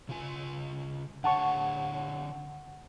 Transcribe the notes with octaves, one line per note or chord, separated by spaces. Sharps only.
C#3 F4 G#5
D3 C#5 F#5 A5 C#6